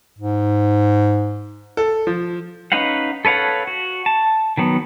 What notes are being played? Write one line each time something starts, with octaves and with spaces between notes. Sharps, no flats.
G#2
A4
F3
C#4 D#4 B4 F5 F#5
A4 B4 C#5 F5 F#5
F#4
A5
D#3 F#3 B3